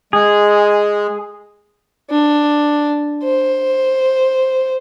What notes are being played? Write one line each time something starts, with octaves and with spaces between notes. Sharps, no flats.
G#3 G#4
D4
C5